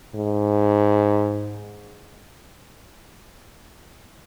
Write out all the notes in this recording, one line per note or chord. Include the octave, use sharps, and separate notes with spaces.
G#2